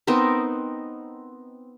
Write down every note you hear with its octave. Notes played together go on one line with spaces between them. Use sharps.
B3 C4 D#4 A#4